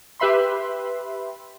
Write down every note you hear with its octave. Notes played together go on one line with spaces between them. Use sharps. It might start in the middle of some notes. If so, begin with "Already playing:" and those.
G4 B4 E5 B5 C6